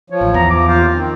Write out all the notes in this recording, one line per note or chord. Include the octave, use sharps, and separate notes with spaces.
F3 C#5
A1
E2 A#5
F3 D6
D#2 F4 C5 F5
D#3 C4